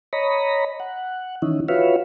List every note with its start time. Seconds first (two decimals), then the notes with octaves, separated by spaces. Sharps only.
0.13 C#5 D#5 A#5 B5
0.80 F#5
1.42 D#3 E3 C#4 D#4 E4
1.68 F4 F#4 B4 C#5 E5 F5